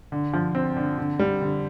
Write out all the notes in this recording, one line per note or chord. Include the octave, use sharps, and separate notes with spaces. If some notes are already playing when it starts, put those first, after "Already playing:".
D3
F3
C4
D3
D3
G3
D3